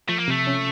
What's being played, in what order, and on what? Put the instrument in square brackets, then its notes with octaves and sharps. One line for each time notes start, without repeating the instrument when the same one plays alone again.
[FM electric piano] F3 [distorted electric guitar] A3
[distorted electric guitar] A#3
[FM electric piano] C3 [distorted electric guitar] A3
[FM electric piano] C#4